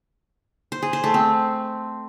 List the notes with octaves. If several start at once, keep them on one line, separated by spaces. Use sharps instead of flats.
C5
G#4
C5
A3
C4